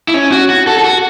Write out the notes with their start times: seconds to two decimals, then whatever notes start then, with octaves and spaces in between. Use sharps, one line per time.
0.08 E4
0.14 C#4
0.32 F#4
0.50 F#4
0.67 A4
0.78 A4
0.84 F#4